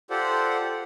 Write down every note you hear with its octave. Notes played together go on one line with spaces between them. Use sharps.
F4 G4 A4 C5 D5 F#5